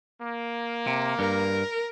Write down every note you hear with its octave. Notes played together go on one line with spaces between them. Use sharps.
A#3
C3
G2 A#4